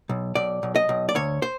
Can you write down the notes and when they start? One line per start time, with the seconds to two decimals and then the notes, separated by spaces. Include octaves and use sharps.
0.09 B1
0.35 B1 D5
0.63 B1
0.76 D#5
0.89 B1
1.09 D5
1.15 D2 C#5
1.42 C5